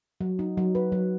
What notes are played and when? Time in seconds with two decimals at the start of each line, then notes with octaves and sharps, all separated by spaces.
0.21 F#3
0.39 D#4
0.57 F#3
0.75 B4
0.92 F#3